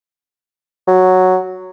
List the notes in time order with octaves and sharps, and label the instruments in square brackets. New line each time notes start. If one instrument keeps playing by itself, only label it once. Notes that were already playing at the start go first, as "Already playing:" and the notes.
[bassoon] F#3